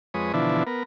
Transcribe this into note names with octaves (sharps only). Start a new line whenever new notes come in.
F2 G#3 B4 C#5 D#6
B2 D3 E3 F3 D4 E4
B3 A#4